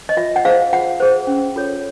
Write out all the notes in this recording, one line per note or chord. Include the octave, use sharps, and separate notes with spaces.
D#5
F4 E5
F#5
G#4 C5 F5
F4 F#5
G#4 C5
C#4
F4 A4 C#5